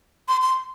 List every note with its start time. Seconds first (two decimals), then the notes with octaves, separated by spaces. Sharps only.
0.29 C6
0.42 C6